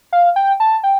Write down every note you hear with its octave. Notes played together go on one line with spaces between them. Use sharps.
F5
G5
A5
G5